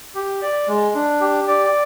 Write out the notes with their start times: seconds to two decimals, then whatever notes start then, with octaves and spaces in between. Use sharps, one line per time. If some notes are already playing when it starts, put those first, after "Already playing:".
0.15 G4
0.42 D5
0.68 G#3
0.95 D4
1.21 G4
1.48 D5